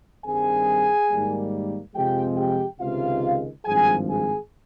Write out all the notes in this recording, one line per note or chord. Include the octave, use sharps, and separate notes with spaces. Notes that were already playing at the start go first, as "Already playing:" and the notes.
G2 D#3 G3 C4 G#4 G#5
G#2 D#3 G3 A#3
F2 C3 F3 G#3 G4 G5
G4 G5
C#2 C3 D#3 G#3 F4 F5
G#1 G2 F3 G#4 G#5
G#4 G#5